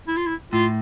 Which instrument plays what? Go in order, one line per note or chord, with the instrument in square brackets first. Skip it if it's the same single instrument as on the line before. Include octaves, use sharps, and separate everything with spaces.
[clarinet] E4
F4
E4
[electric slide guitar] A2 [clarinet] F4